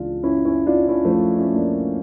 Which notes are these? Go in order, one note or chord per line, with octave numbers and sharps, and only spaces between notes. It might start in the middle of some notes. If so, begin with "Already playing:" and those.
Already playing: C#2 C#3 E3 D4 F4
C#4 E4
C#4 E4
D4 F4
C#4 E4
F3 A3
C#4 E4
A#3 D4